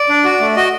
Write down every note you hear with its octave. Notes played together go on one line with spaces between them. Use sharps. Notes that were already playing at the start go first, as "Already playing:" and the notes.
Already playing: D5
D4
F#4
A3
F#4 D#5